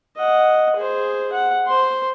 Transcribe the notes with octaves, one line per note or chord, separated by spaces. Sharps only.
D#5 F#5
G#4 C5
F#5
C5 C6